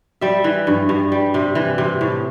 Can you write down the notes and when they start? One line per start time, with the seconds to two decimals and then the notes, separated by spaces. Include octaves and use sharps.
0.21 G3 E5
0.44 E3
0.67 G2
0.89 G2
1.12 G3
1.34 C3
1.55 E3
1.78 C3
2.01 A2